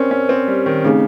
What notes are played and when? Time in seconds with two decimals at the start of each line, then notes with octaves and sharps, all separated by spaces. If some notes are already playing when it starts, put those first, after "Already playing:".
Already playing: C4 C#4 G4 A#4 D5
0.11 C#4
0.29 C4
0.48 G3
0.66 D#3
0.84 C#3 A3 C4 D#4 G#4